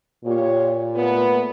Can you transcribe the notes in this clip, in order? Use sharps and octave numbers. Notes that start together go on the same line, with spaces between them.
A#2 F4 G4 C#5
A3 B3